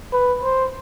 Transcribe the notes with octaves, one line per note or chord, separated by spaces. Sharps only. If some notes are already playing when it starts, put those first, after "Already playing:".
B4
C5